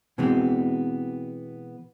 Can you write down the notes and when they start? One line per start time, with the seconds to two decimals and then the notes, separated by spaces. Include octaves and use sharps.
0.18 B2 E3 G#3 B3 C4